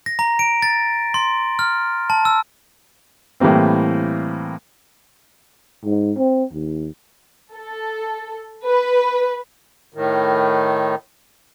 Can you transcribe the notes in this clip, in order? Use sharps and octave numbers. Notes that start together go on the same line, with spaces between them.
A#6
A#5
D7
A6
C6
F6
A5
E6
A2 E3 G3 A#3 C4
G#2
C4
D#2
A4
B4
A2 D#3